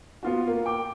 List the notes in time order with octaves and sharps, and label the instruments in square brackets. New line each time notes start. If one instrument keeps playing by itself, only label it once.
[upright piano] B3 F4 F#4
A#3
G5 D6